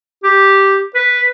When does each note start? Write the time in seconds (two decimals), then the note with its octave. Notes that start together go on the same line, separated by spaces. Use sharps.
0.24 G4
0.95 B4